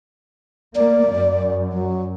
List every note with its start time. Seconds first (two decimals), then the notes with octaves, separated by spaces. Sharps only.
0.75 A#3 D5
1.10 F#2
1.72 F#3